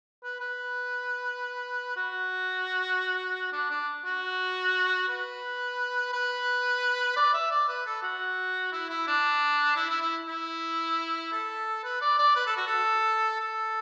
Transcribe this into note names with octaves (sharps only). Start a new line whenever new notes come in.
B4
B4
F#4
D4
D4
F#4
B4
B4
D5
E5
D5
B4
A4
F#4
E4
E4
D4
E4
E4
E4
E4
A4
B4
D5
D5
B4
A4
F#4
A4
A4